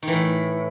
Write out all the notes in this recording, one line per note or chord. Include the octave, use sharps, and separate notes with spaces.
D#3
E3
A2